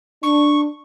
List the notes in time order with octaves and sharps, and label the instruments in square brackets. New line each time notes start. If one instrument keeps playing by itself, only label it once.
[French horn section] D4 [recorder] C#6